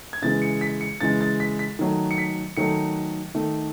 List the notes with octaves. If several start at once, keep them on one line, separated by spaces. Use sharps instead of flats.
G#6
C#3 E3 G#3 A6
C#7
B6
C#7
C#3 E3 G#3 A6
A6
B6
B6
D#3 F#3 A3
C#7
B6
D#3 F#3 A3 C#7
D#3 A3